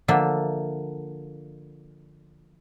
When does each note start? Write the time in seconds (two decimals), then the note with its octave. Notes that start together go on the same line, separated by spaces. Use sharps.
0.08 D3 F3 A#3 D4 E5